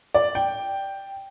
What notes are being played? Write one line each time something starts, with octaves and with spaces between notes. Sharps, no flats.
D5
G5